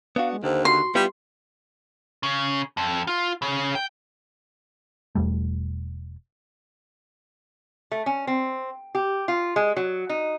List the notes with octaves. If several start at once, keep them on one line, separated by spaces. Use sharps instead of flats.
B3 D4 F#4 F5
G#3
D#2 D3 C5
F#4 C6
G3 B3 E4 F4 G4
C#3
F2
F4
C#3
G5
E1 E2 G3 A3
A3
C#4
C4
G4
F4
G#3
F#3
D#4